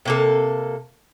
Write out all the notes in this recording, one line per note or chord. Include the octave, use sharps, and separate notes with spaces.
C3 A#3 A4